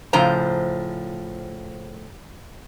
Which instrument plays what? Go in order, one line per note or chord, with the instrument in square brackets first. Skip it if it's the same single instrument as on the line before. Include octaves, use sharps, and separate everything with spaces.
[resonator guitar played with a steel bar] A2 C#3 F3 C5 A#5